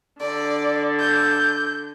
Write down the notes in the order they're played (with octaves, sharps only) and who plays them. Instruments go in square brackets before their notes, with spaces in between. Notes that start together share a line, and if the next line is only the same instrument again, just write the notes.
[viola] D3 [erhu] D5
[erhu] G6